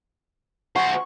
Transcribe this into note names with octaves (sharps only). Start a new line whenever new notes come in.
F#4 C5 F#5 G#5 C6 C#6